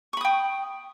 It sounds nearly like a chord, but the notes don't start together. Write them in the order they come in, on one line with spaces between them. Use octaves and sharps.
C#6 B5 D#6 G5